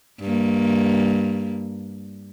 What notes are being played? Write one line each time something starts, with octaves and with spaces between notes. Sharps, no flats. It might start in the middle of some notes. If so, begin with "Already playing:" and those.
G2 A#3